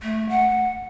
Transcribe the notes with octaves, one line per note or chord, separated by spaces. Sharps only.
A3
F#5